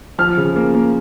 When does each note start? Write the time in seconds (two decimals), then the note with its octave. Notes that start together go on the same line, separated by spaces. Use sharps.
0.18 F3 F6
0.37 C#3
0.56 A#3
0.75 A#3